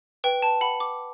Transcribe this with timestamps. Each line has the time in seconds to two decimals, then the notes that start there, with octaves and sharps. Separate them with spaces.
0.24 B4 G5
0.42 A5
0.61 F#5 B5
0.80 D6